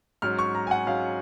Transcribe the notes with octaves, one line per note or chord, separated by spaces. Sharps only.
G#2 F#3 C#4 F6
C#6
A#5
G#5
F#5
G#2 F#3 C#4 F5